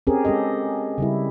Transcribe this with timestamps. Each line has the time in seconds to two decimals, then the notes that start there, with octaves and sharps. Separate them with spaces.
0.07 C4 C#4 G4 G#4 A#4
0.25 G#3 C#4 G4 A4 D#5
0.98 C#3 G3 E4